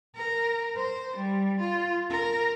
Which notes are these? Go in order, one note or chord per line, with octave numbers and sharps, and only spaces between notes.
A#4
C5
G3
F4
A#4